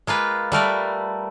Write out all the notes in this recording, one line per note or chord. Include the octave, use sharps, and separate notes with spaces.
G#3 A#3 F4 B4
G3 A3 A#4 B4